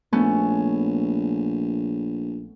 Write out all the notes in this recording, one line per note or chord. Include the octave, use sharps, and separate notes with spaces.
A#1 A3 B3 C#4